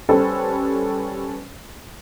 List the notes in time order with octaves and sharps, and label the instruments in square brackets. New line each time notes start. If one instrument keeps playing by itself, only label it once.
[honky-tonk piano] G3 C#4 G4 A4 B4 C5